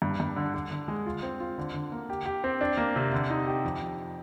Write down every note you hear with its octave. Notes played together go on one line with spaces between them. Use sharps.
G2
G2
D3
D3
D3
G#3
F4
C4
F4
D3
D3
A#3
G4
G4
C4
D4
A#3
C3
D3
D#4
G4
F2
F2